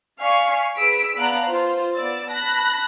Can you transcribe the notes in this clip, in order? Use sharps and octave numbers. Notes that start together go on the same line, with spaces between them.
D5 F5 G#5 C#6 B6 C7
G#4 B4 E6 B6 D7
B3 D5 F5 A5 A#5 F#6
F4 C5
B3 D5 E6 A6
A5 B5 F#6 A#6